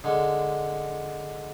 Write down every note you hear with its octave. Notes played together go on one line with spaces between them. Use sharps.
D3 G#3